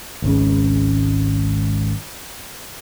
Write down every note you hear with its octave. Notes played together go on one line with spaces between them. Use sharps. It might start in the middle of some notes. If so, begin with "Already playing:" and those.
G#1 C#2 C#3